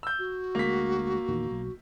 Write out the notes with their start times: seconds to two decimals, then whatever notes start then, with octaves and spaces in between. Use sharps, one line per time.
0.03 E6 G6
0.19 F#4
0.55 D2 G#3 A#3 B6
1.29 E2 A#2 D#3
1.51 B1